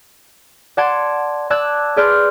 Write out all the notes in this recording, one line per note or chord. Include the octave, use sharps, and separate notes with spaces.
D5 F#5 A5 C6 G#6 D7
D5 A5 D6 E6 F#6 G#6
G#4 B4 D5 C6 F6 G6